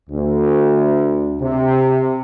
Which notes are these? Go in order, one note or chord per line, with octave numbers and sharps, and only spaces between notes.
D2
C3